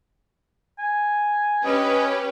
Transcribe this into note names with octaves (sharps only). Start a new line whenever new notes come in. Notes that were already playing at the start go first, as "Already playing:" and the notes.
G#5
C#4 G4 B4 D#5